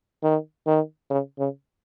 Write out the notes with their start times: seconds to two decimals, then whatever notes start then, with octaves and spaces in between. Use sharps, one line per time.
0.23 D#3
0.67 D#3
1.10 C#3
1.39 C#3